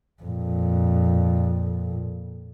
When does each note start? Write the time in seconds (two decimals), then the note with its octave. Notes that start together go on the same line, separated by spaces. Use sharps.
0.23 F2 A#2